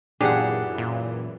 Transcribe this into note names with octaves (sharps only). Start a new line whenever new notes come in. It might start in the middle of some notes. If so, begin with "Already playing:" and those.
F#2 A#2 E3 D4 G4 G#4 F#5
A#2